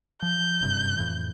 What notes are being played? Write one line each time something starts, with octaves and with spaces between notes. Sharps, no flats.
F3 G6
F#1 G2 C3
F2 A2 E3